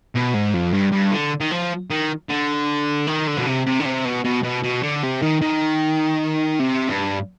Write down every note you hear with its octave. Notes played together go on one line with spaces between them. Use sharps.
B2
G#2
F2
G2
G2
D3
D#3
F3
D#3
D3
D#3
D3
B2
C3
C3
D3
C3
B2
B2
B2
B2
D3
C3
D#3
D#3
C3
G2